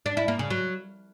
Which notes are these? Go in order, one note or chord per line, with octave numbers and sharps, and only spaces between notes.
D4
E4
A#3
C#3
F#3